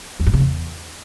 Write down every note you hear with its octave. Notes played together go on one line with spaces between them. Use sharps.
E2
G2
C#3
E2